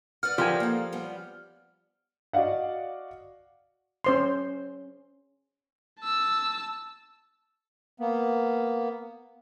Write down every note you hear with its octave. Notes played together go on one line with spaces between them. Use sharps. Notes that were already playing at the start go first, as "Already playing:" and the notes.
B4 D5 F#5 F6
F3 G4 A#4 G#5
A#3 A4
G3 B3 C#4
F#4 D5 D#5 F5 F#5
C#4 C5 C6
A5 E6
A#3 B3